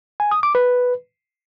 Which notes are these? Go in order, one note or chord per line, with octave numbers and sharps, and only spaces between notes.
G#5
D#6
D6
B4